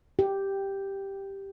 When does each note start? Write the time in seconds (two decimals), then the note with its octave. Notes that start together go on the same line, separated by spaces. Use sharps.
0.19 G4